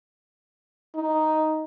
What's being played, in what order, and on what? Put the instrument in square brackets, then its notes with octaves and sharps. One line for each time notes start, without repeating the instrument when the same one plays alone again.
[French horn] D#4